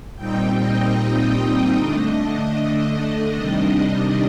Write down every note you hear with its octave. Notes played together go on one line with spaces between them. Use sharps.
A#2 G3 C4 D#4 G5
D#5
D3 A3 D4 D#5
C3 D#3 G3 D4